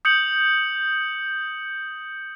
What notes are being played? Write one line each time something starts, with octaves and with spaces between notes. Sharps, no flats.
D#6 G6 C#7 F#7